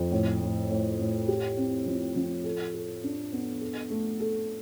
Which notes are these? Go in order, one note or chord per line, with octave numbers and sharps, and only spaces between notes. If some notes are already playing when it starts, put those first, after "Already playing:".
Already playing: F2
A2
A2
A2
A2
G4
C4
F3
F3
A4
A4
D4
B3
A4
A3
A4